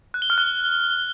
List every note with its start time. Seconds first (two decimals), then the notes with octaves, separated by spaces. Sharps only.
0.14 F#6
0.22 G7
0.30 F6
0.38 F#6